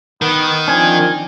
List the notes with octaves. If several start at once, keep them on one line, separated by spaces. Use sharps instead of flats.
D#3 B3
F3 C4 D4 G#5